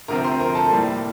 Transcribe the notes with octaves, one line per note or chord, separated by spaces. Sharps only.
D2 C3 F3 C4 A#4 A#5
C5 C6
A#4 A#5
A4 A5
A2 G3 A#3